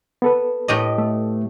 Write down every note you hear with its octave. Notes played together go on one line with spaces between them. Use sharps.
B3 A4 B4
A2 G4 D#5
A3